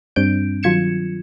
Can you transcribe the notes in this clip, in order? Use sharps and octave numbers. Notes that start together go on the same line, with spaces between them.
G2 G3 C4 D4 G6 D7
D#3 F#3 F4 G#6 C#7 E7